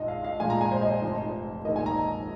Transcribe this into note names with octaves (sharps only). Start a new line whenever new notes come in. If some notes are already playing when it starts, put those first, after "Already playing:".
Already playing: A#1 G#2 F3 D#5
F5
F5
A#1 A#2 F3 G#3 G#5
A#5
G#5
C5
D#5
C5
F1 F2 F3
A#1 G#2 D#3 A#3 D#5
G#5
A#5